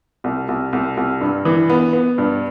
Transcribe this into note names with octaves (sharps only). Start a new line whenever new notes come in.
C2
C2
C2
C2
G2
E3
B3
B3
G2